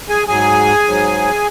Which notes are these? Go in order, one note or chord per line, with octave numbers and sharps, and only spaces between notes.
G#4 G#5
G#2 F#3 G#4 G#5
G#2 F#3